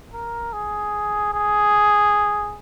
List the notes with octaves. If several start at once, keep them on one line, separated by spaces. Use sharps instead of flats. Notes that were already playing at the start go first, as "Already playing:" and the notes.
A#4
G#4
G#4